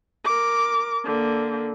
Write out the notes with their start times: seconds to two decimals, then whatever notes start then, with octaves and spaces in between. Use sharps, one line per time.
0.25 A#4 D6
1.05 D3 A#3